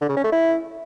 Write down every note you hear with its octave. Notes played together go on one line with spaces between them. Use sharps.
D3
C#3
C#4
A3
E4